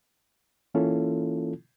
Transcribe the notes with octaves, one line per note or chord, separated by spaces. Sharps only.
E3 A#3 C#4 E4 F4 A4